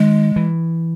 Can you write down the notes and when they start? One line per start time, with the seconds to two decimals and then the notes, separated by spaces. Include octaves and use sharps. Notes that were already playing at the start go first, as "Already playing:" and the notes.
Already playing: D#3 G#3
0.36 E3